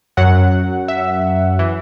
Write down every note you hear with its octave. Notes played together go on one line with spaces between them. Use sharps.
F#2 F#3 F#5
E5
E3